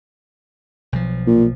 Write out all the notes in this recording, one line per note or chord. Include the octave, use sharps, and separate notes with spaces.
B1 F3
A#2